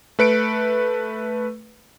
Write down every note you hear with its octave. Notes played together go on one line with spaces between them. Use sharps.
A3 B4 C#7 D7